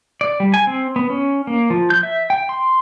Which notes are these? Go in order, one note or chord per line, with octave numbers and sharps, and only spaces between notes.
D5
G3
G#5
C4
B3
C#4
A#3
F3
G6
E5
G5
C6